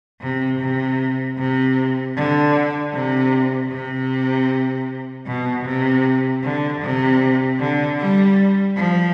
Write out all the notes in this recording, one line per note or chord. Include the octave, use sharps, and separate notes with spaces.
C3
C3
C3
D3
C3
C3
B2
C3
D3
C3
D3
G3
F3